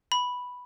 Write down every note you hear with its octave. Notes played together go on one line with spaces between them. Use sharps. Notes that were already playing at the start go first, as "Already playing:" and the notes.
B5